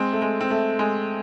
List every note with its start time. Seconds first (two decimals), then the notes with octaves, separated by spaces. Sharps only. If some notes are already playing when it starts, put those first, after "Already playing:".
Already playing: G#3 C4
0.13 A3
0.22 G#3
0.41 C4
0.50 A3
0.79 G#3